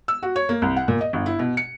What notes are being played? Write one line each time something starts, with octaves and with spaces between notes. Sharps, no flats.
E6
F#4
C#5
A#3
C2
F#5
A#2
D#5
G1
E4
B2
C#7